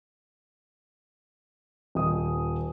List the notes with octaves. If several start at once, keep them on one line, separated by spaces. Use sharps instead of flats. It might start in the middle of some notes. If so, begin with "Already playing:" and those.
D#1 D#6